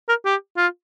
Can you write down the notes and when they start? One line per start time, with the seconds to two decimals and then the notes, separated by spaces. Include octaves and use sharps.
0.09 A#4
0.25 G4
0.57 F4